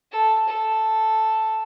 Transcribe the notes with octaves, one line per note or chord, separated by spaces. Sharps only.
A4
A4